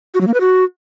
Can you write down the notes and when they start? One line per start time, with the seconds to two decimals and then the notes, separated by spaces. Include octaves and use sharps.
0.14 F#4
0.21 F#3
0.27 A#3
0.34 B4
0.40 F#4